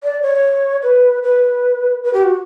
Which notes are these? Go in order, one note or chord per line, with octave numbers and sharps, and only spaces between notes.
D5
C#5
B4
B4
B4
G4
F#4